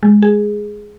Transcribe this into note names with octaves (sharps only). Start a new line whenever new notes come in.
G#3
G#4